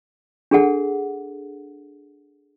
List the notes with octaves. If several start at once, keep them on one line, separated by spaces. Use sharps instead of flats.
D4 G#4 A4 F#5